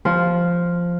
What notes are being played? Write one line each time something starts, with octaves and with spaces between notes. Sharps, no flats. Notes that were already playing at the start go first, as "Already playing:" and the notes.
F3